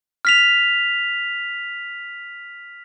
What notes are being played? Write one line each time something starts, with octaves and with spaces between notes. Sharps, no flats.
F6 B6 F7